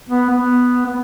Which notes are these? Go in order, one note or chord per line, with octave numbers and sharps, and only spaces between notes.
B3
B3
B3